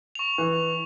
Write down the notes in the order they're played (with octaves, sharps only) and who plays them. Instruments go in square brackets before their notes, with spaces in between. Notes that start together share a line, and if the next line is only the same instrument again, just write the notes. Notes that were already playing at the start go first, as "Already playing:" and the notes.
[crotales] C#6 F7
[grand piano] E3